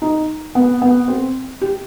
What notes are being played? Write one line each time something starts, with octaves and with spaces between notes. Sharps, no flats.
D#4
B3
B3
C4
G4